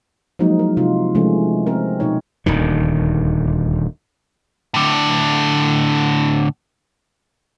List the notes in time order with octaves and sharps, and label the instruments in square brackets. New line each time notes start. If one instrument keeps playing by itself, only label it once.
[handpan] F3 F#3 G#3 A#3 D#4 F#4
E4 A#4
C3 D#4 F4
C3 E3 F3 G#3 A3 C#4
C4 A#4
B2 D#4 C#5
[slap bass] D#1 D2 D#3
[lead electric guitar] A2 D3